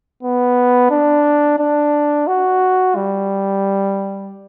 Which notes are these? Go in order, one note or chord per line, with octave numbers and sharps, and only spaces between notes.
B3
D4
D4
F#4
G3